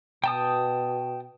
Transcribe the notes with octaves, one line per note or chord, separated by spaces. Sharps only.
B2 G5 A5 D#6